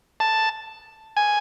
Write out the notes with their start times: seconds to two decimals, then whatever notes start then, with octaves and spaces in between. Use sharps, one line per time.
0.20 A5
1.17 G#5